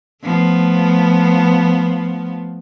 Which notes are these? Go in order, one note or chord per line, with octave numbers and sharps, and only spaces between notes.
F3 A3 B3